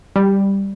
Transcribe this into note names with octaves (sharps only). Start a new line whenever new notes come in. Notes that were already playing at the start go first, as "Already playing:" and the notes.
G3